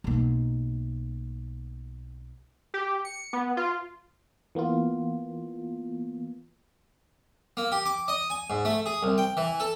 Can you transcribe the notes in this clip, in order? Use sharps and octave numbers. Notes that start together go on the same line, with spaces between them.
B1 A#3
G4
C#7
B3
F4
E3 A#3 B3 F4
A#3
G4
D6
D#5
G#5
G#2
A3
G#4
C2
G5
E3
A4